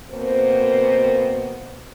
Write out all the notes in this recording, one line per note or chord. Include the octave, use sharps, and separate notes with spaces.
B2 A#3 C4 A#4 C5